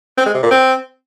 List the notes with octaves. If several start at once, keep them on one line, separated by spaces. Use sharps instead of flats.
C4
G#3
C3
A#2
C4